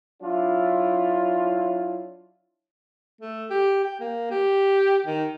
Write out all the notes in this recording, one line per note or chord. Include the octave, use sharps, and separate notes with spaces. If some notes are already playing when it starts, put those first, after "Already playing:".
F#3 D4 E4 F4
A3
G4
G5
A#3
G4
D#3